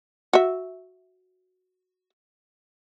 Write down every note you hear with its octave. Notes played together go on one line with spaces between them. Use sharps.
F#4 E5